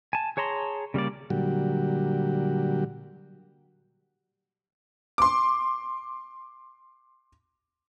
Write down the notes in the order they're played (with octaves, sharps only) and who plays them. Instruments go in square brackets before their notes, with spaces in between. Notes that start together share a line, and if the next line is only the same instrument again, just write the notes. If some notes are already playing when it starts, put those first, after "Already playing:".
[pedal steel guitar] G#5 A5
G#4 C#5 A5 A#5 C6
C#3 G3 A#3 D5
[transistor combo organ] A#2 D3 F#3 G3 F#4 G4
[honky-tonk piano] C6 D6